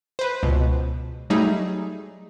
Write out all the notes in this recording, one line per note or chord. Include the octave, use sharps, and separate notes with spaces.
B4 C5
C#2 B2
F#3 G3 A3 D#4 G#4